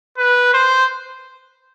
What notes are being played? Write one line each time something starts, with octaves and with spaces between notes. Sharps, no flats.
B4
C5